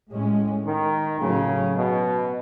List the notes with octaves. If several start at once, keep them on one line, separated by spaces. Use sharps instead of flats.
A2 G#3 C#4
D#3
A2 C#3 F#3 A3 C#4
B2